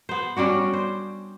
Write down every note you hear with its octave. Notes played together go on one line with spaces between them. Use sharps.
B3 C5
G3 C#4 D4 F#4
C5